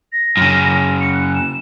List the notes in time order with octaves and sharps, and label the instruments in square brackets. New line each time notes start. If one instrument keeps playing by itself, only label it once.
[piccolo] A#6
[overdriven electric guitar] F#2 C#3
[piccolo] C#7
F#6
E7